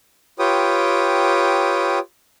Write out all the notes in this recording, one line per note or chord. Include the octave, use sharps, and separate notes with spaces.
F4 G4 B4 C#5 G5 D#6